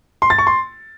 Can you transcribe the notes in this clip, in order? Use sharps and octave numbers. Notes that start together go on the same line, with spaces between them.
C6
A6
C#6
C6